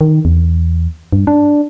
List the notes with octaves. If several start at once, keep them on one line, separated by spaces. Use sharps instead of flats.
D#3
E2
G2
D4